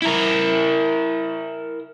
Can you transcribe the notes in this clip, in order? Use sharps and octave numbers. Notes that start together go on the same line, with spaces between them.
E4 A#4